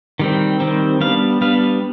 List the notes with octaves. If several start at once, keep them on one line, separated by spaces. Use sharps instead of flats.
D#3 G3 C4
D#3 G3 C4
G3 B3 D4 F5
G3 B3 D4 F5